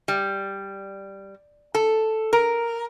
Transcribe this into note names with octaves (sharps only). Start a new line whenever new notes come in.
G3
A4
A#4